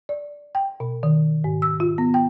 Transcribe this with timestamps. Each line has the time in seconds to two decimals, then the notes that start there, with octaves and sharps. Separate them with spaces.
0.09 D5
0.55 G5
0.80 B2
1.03 D#3
1.44 G#2
1.62 E6
1.80 F4
1.98 B3
2.14 G5